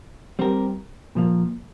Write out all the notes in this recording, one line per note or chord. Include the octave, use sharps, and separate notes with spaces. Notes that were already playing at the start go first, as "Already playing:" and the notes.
G3 C4 G4 A#4
A#2 F3 A#3